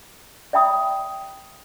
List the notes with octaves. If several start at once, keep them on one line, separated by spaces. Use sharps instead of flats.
D5 E5 G5 B5 D#6